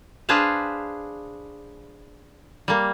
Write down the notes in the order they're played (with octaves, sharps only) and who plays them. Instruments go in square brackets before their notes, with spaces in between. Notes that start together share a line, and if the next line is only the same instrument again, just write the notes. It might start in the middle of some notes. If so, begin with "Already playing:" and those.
[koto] D4 G#4 B4 C5 F5
G3 A#3